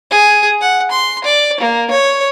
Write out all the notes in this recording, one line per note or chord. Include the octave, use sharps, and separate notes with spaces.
G#4
F#5
C6
D5
A#3
C#5